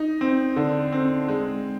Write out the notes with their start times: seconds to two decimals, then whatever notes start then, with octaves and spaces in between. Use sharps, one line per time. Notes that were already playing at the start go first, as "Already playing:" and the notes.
Already playing: D#4
0.21 C4
0.56 D3
0.92 C4
1.28 G#3